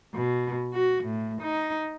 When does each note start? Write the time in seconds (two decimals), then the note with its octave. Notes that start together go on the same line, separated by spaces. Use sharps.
0.14 B2
0.74 F#4
1.04 A2
1.42 D#4